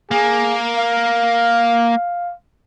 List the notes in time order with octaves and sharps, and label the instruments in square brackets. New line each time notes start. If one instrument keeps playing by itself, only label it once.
[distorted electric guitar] A#3 [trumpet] G#4
[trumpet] F5